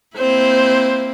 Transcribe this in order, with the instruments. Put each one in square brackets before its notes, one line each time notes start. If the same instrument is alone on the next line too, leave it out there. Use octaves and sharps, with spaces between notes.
[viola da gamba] A#3 C4 E4 [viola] C5